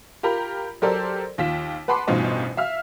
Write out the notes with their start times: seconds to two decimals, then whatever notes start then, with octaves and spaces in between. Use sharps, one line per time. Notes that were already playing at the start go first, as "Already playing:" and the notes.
0.23 F4 G4 A#4 A#5 B5
0.82 F#3 G4 A4 A#4 C5 D5
1.38 D#2 F4 B6 E7
1.88 B4 F#5 A5 B5 C6 D6
2.07 A1 G2 B2 D#4 F4 C5
2.57 E5 F5 F6